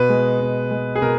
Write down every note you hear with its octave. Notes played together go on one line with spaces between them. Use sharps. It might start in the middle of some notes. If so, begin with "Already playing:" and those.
Already playing: B2 B4
G#3
B2
G#3
G#4
B2 A#4